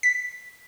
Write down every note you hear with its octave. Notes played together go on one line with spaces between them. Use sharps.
B6